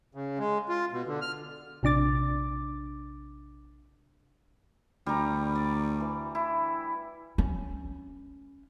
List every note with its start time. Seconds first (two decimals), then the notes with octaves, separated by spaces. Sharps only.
0.15 C#3
0.39 G#3
0.69 F4
0.92 B2
1.07 D3
1.22 F6
1.83 A#1 C3 D4 D6 A6
5.06 D2 G3 A#5
5.55 D5
6.00 E3
6.35 E4
7.38 C#4